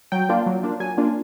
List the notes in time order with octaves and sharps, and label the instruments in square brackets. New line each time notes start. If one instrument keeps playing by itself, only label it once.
[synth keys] F#3 G5
A#3 D4 F4
F#3
A#3 D4 F4
F#3 G#5
A#3 D4 F4